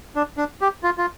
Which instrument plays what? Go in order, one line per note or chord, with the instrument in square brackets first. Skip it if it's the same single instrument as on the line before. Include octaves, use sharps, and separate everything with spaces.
[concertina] D4
D4
G4
F4
F4